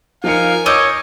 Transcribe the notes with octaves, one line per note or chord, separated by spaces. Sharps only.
F3 D#4 A#4 F5 G#5 C#7
C#5 D#5 D6 E6 G6 D7